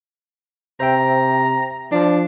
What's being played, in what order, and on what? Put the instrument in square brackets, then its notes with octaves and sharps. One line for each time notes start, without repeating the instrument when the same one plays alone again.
[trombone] C3 [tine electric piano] C5 E5 G5 [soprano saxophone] A#5
[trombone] F3 [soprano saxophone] D4